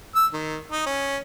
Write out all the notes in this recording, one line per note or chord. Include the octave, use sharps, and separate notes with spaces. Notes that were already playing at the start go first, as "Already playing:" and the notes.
E6
D#3
D#4
C#4